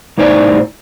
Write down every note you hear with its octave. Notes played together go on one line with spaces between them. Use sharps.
C2 A2 D#4 C5 D5 G#5